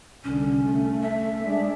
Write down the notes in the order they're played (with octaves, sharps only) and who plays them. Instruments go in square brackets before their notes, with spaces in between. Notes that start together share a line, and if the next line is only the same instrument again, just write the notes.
[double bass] C2 D3 [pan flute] C#4
[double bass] A3
[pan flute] E5
[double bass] G#3 D4